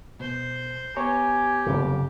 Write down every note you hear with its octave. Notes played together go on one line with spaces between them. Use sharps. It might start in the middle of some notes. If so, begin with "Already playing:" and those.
B2 C5
B3 G4 C#5 G#5 A#5
F#1 F2 C3